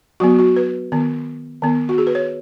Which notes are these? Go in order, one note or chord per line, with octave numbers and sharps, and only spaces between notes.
F#3 B3 F#4
F#4
B4
D#3 B3
D#3 B3
F#4
G#4
B4
C#5